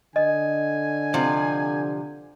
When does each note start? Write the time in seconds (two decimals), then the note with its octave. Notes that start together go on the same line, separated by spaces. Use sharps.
0.16 D3 D#5 G#5
1.14 C3 F3